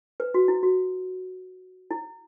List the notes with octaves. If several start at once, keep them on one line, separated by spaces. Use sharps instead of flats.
B4
F#4
E4
F#4
E4